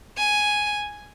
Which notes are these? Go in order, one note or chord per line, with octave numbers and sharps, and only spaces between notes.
G#5